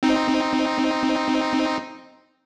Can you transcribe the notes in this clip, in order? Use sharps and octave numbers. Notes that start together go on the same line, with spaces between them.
C4 D#4